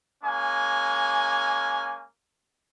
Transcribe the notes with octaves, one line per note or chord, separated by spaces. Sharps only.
G#3 A#3 C#4 G#5